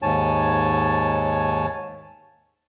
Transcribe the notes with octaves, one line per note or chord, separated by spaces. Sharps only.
D#2 G#2 C#5 G#5 A5